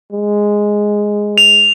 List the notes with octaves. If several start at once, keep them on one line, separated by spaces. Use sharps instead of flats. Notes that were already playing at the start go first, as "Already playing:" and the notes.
G#3
F7